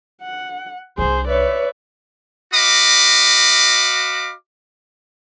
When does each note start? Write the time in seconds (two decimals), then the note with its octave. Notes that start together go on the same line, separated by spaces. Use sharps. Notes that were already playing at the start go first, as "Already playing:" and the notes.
0.22 F#5
0.98 C2 D4 G#4 C5
1.28 B4 C#5 D5 E5
2.53 F#4 D#5 F5 B5 D6